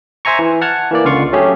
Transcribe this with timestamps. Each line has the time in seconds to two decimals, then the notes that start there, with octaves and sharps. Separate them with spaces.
0.25 C5 E5 G#5 A#5 C#6
0.39 E3
0.61 F#5 A5 F6 G#6
0.91 E3 A#3 D5
1.04 C#2 D3 F4 F5 C#6
1.32 F#3 A3 C#4 G4 G#4